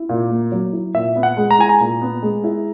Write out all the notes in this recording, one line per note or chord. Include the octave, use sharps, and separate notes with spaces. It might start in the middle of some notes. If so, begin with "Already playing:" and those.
Already playing: E4
A#2
A#3
F#3
E4
A#2 E5
B3
F#5
G#3
A#5
E4 G#5
A#5
A#2
B3
G#3
E4